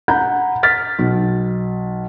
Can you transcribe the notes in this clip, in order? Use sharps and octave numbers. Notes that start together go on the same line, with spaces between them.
F#5 A#5 B5 G6
F6 A6 B6
B1